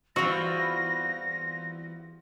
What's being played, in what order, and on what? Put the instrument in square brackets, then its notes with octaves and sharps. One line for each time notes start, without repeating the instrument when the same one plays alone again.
[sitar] E2 G3 B3 [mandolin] C4 F4 [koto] F#4 [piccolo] A#6